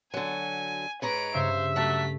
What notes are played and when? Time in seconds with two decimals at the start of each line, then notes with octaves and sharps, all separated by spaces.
0.14 D3 F#3 G#5
1.02 G#2 B4 C#5 A#5 D7
1.34 G2 C#3 C5 E5
1.76 F#3 A3 F#5 A5 B6